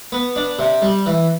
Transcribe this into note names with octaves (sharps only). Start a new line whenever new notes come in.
B3
D4
C3
G3
E3